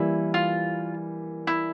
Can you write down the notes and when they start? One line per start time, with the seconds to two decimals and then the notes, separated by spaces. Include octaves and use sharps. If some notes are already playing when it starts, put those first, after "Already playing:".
Already playing: E3 G3 A#3 E4
0.34 F4
1.47 E4